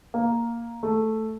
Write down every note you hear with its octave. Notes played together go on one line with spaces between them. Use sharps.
A#3
A3